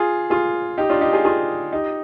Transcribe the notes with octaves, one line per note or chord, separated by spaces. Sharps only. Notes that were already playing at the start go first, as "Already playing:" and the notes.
Already playing: F4 G#4
F4 G#4
D#4 G4
D4 F4
D#4 G4
F4 G#4
F4 G#4
D#4 G4